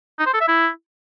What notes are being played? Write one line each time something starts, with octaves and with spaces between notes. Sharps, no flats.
D#4
C5
A4
E5
E4